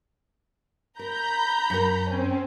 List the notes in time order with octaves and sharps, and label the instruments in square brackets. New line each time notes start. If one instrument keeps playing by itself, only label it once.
[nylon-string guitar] A#4 [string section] A#5 B5 G6
[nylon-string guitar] F#2 A#4
[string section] C4 C#4